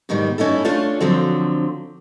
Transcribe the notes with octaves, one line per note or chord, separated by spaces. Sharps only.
G#2 B2 D#3 G3
G2 C#4 D#4 E4 A4
A3 C#4 D4 F4 A4
D3 F3 F#3 C4